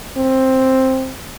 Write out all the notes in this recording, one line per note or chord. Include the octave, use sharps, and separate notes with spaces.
C4